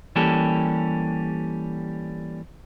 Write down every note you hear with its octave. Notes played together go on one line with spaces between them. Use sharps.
E3 G3 A#3 C#4 G4 A4